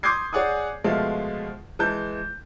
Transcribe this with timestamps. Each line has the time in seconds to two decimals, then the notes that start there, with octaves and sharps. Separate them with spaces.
0.03 C6 D6 D#6 G6 G#6 C7
0.33 G#4 C#5 D5 F#5 G#5 D#6
0.84 B2 F3 G#3 A3 F4
1.79 E3 G#3 A5 G6